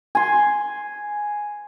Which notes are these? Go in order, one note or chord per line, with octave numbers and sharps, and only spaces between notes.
G#5 C6